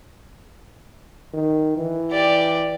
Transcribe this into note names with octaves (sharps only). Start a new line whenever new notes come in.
D#3
E3
G4 D5